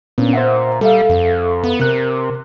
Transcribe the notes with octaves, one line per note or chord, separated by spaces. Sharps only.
A#2 B3 C#4 D4
C5 E5 F#5
G3 A4 E5 F5
F2
B3
C3 A#4 F#6